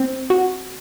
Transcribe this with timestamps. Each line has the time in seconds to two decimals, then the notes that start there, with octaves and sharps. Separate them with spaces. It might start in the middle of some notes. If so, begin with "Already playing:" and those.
Already playing: C4
0.30 F#4